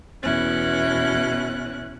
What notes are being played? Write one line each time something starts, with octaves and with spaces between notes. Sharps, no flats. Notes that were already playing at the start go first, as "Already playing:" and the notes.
E2 B2 C#4 E4 F#6